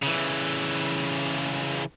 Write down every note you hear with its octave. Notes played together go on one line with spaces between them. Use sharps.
C#3 E3